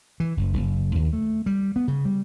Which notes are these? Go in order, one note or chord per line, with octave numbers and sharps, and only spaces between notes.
E3
F#1
F#1
D#2
A3
G3
B3
C#3
G3